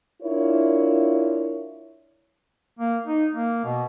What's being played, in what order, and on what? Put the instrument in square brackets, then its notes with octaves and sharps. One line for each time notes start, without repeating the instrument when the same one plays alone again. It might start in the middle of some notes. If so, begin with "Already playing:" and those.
[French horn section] D4 E4 F4 A#4 C#5
[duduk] A#3
D#4
A#3
B2